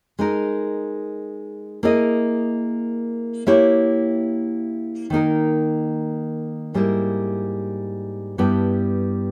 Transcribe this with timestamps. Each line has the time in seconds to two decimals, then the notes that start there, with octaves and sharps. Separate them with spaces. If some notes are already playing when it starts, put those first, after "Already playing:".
0.19 G#3 D#4 A#4
1.83 A#3 E4 G#4 D#5
3.47 A#3 E4 G4 C#5 E5
5.10 D#3 A#3 D#4 A#4
6.74 G#2 G3 A#3 E4
8.38 G2 G3 B3 E4 G4